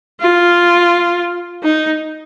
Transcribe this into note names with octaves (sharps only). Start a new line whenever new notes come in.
F4
D#4